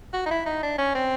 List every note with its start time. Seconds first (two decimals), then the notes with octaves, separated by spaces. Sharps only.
0.14 F#4
0.26 D#4
0.31 E4
0.46 D#4
0.63 D4
0.78 C#4
0.95 C4